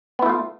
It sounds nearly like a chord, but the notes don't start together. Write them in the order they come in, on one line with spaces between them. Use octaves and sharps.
B3 E4 A3 F4